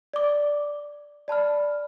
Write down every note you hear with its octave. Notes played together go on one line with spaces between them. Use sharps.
D5 D6
D5 A5 B5 F6